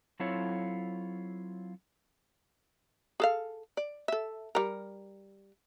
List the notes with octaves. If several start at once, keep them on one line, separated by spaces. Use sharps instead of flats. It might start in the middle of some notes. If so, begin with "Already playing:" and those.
F#3 C4 E4 F4 A4 C#5
G#4 A4 F5
D5
A4 E5
G3 A#4